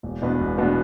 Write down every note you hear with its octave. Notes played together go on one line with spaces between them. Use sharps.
E1
E2 B2 B3 D4
E1
E2 B2 B3 D4